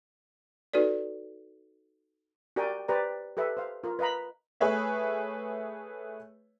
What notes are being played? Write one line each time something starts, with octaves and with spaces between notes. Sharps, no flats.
D#4 F#4 A4 B4 D5
F#4 G4 A#4 D5 G5 G#5
G4 B4 C5 D5 A#5
G4 A4 B4 E5
C5 F5
F4 A#4
B4 D#5 F5 A#5 B5
A3 G#4 B4 C#5 E5